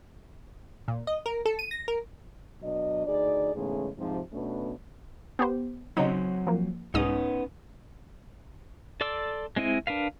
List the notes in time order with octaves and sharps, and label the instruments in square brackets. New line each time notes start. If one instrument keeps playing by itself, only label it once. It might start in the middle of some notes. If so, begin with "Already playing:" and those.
[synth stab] A#2
D#5
A#4
A4
D#7
A#6
A#4
[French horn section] B2 F#3 D4 D#5
D2 D#4 G#4 D5
E2 G#2 C#3 G#3 A3 C#4
G#2 C3 F3
B2 A3 B3 C#4 D4 B4
[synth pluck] B3 G4 C5
[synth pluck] C#3 D#4 [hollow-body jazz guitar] F#3 C4 C#5
[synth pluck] F3 A#3
[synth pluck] C2 G#2 D#6 [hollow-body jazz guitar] B3 C#4 D#4
[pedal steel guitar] A4 D5 C6 D6 E6
G#3 C4 E4 D#5
D4 A#4 B4 F5